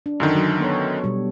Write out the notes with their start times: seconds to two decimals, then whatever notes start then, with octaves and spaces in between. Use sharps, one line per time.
0.06 D4
0.20 F#2 D3 D#3
0.35 F#3
0.60 B3 A4 C#5
1.04 B2 G3